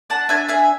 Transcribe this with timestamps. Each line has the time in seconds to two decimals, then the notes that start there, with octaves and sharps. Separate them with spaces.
0.10 D4 F#5 A5
0.29 D4 E5 G#5
0.48 G#4 E5 G#5